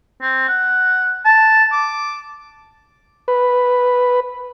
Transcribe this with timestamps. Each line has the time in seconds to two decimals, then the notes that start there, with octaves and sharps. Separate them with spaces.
0.21 C4
0.48 F#5
1.25 A5
1.72 D6
3.28 B4